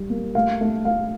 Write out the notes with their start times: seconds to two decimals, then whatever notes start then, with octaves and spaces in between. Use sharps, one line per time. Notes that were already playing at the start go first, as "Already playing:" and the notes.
Already playing: G3
0.10 A#3
0.35 A3 F5
0.61 A3
0.85 A3 F5